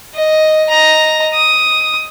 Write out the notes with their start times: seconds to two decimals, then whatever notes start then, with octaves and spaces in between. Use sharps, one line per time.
0.15 D#5
0.69 D#5 A#5
1.34 D#6